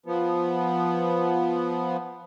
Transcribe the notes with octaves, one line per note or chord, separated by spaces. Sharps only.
F3 B3